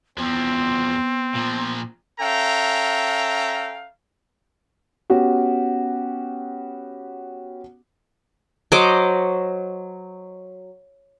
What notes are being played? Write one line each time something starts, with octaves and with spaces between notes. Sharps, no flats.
E2 F3 B3 C4
A#2 F3
C#4 A4 E5 F5 G5 A#5
B3 C#4 F#4 G4
F#3 C5 D#5 D6